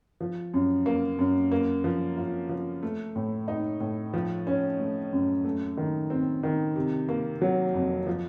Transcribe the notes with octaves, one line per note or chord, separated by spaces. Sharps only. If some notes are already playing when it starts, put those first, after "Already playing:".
F3
F#2
A#3
F#2
A#3
F3
F4
F3
A3
A2
D#4
A2
F3
C#4
A3
F#2
A3
D#3
C4
D#3
C3
A#3
F#3
F2
F3